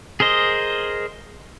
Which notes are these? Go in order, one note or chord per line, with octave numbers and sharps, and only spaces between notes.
G#4 A#4 C5 D#5